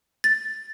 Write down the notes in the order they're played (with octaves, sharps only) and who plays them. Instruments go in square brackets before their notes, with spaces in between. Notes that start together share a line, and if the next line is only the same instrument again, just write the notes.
[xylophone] A6